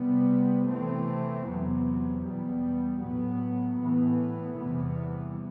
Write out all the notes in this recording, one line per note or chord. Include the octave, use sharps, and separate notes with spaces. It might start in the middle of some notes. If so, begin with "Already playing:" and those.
Already playing: C3 G3 B3
C3 E3 A3 C4
E2 C3 F#3 B3
E2 B2 G3 B3
A2 F#3 B3
A2 E3 B3
E2 C3 E3 G3 B3